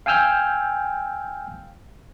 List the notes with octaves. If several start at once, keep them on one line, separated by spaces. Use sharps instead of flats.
F5 G5 G#5 E6 F6 G6